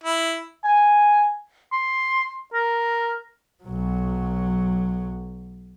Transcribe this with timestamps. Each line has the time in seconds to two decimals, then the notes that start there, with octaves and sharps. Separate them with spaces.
0.04 E4
0.64 G#5
1.72 C6
2.54 A#4
3.63 B1 F#3